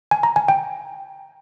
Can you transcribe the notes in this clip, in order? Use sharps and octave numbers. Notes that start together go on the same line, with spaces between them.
G#5
A#5
G#5
G5